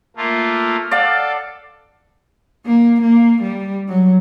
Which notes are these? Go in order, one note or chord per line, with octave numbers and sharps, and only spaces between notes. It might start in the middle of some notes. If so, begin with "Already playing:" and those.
A3 A#3 F4
A4 D5 F5 F#5
A#3
A#3
G3
F#3